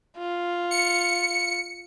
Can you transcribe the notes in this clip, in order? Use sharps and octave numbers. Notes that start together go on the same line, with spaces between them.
F4
C#7